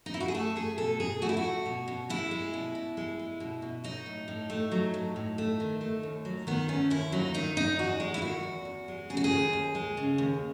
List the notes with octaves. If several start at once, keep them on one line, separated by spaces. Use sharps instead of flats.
D#4
E4
F#4
G#4
A3 A4
A3 G#4
B2 A4
B2 G#4
A3 F#4
E4
F#4
A3
B2
B2
G#3 E4
G#3
B2
B2
G#3
G#3
B2
B2
F#3 D#4
A2
A2
A3
F#3
A2
A2
A3
D#3
A3
D#2
F#3
D#3 B3
A3 C#4
D#2 E4
F#3 D#4
D#3 D#4
E2 D#4
E2 F#4
G#3
E4
D#3 F#4
E2
E2
G#3
C#3 G#4
F#4
G#4
D#2
D#2
G#3
C#3
D#2